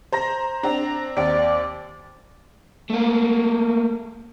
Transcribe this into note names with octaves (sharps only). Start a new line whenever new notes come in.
C5 A#5 A#6
C4 D4 A#5
D#2 C4 D5
A3 A#3